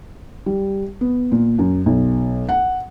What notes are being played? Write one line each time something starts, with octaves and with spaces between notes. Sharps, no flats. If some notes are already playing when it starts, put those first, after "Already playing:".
G3
B3
A#2
F#2
B1
F#5